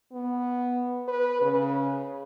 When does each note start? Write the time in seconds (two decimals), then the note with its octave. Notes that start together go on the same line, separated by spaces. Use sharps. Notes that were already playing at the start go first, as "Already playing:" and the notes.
0.12 B3
1.08 B4
1.42 C#3